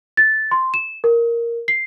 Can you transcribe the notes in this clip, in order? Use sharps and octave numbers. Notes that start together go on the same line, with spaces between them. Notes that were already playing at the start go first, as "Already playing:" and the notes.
A6
C6
E7
A#4
C7